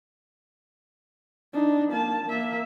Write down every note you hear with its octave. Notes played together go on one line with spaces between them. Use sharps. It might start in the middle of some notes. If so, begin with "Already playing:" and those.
D4 D#4
A#3 A5
A#3 E5